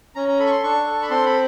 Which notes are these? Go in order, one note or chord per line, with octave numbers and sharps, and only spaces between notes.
C#4 A#5
A#5
A4 B5
C#6
C6
D4 C#6
A4
B5
C4 C6
B5